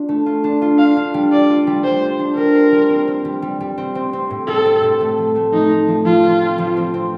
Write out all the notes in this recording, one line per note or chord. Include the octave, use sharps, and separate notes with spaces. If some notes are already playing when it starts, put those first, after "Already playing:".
Already playing: D4 F4
A3
F4
D4
F4
D4 F5
D4
G3
F4 D5
F4
G3
G3 C5
C5
D4
G3 A#4
C5
G3
C4
C4
G3
G3
G3
C4
C4
C4
A2
G3 A4
C4
A2
A3
F3
A3
F3 D#4
A3
F3
F3 F4
C4
C4
F3
C4
C4